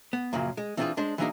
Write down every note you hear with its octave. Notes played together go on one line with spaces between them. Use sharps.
B3
F#2 A#2 C#3 F3 F#3
G#3
E3 C4 D4 D#4 F4 G#4
G#3 D4 C5
E3 F#3 A#3 D4 D#4 G#4